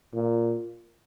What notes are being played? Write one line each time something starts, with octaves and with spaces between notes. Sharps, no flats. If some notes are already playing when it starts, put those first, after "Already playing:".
A#2